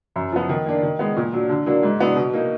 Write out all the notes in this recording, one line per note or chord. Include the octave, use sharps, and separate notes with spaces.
F#2
F3 B3
D#3
A#3 D4
D#3
G#3 B3
A#2
F#3 D4
D3
F#3 A#3 D4
G#2
F#3 B3 D4
B2
A#3 D#4